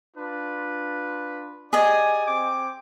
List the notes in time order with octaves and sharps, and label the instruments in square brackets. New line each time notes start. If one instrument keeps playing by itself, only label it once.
[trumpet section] D4 F4 B4
[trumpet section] G4 D5 G#5 [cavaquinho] G#4 D#5
[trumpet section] C4 G5 D6